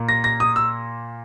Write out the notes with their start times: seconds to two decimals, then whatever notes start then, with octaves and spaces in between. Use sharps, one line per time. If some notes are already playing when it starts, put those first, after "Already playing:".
Already playing: A#2 A#3
0.09 A#6
0.24 A#6
0.40 D#6
0.56 E6